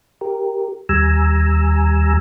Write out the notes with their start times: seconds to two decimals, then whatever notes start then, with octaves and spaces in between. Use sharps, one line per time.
0.21 G4 A#4
0.89 D#2 G3 G#5 A#5 E6